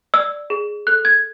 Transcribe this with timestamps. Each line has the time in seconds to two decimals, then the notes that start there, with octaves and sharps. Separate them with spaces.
0.14 D5 E6
0.50 G#4
0.87 A4 F#6
1.05 G#6